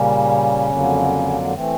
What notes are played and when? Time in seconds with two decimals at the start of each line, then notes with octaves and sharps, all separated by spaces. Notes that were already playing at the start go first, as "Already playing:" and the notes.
Already playing: A#2 C#3 G3 A#3 C#4
0.69 F2 D3 F#3 A#3
1.54 E3 A3 C4